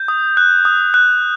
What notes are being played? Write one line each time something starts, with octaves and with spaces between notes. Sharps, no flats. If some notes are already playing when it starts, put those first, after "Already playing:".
Already playing: G6
D#6
F#6
D#6
F#6